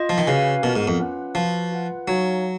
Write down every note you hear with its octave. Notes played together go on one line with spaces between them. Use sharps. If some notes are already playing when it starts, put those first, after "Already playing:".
Already playing: F4 D#5
F3
D#3
C#3 C#4 F#4 B4 F5 G#5
B2 B3 F4 A#4
G#2
F2
C#4 F4 B4 F#5
F3 F#4 B4 F5
F4 B4 F#5
F#3 D#4 F#4 C#5 F5 G#5